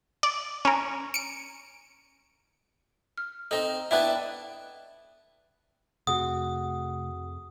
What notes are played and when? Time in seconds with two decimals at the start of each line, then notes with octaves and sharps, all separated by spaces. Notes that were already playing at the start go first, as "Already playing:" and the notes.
0.23 D5
0.65 C#4 A#4
1.14 C#7 D7
3.18 F6
3.51 C4 D#4 A4 D#5
3.91 B3 D4 E4 E5 G5 F#6
6.07 F2 C3 A3 F#4 G#4 F#5 D#6